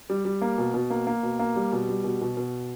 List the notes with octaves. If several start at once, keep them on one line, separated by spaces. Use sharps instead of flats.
G3
G3
A#3
B2
B2
A#3
A#3
B2
A#3
G3
B2
G3
B2
B2
B2